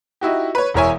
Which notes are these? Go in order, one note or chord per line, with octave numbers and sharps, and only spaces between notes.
D#4 E4 F#4 G4
B4 C#5
E1 E3 A#4 C#5 E5 G#5